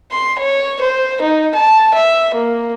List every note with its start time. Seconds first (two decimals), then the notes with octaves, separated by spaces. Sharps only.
0.11 C6
0.40 C#5
0.81 C5
1.21 D#4
1.55 A5
1.94 E5
2.34 A#3